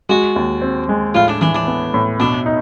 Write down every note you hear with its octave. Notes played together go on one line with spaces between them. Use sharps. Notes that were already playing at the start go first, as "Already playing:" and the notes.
G#3 F#4
D#2
C4
G#3
A2 F4
D4
E3 D4
D4
B3
A2
B2 D4
D#4